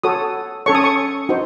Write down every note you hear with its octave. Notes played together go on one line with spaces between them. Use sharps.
F#4 A4 C#5 D#6
C#4 A4 C#5 C#6
D#6
C#6
D#4 F#4 C5